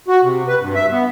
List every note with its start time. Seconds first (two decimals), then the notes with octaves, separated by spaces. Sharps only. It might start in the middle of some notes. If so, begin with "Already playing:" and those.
0.08 F#4
0.23 C3
0.48 B4
0.60 G2
0.75 E5
0.91 B3